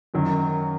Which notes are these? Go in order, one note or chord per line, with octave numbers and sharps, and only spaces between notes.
F#2 D#3 F#3